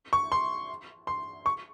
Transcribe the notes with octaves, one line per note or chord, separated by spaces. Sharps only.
C#6
C6
C6
C#6